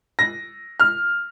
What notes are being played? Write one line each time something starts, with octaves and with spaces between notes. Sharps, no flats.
A#6
F6